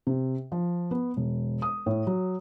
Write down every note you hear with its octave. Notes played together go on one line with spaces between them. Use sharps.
C3
F3
B3
E1
D#6
A2
F#3